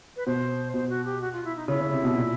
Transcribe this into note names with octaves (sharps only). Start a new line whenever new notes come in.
B4
B2 C5
B2 C5
F#4
G4
F#4
F4
E4
D#4
C#3 E4
C#3
C3
B2
A#2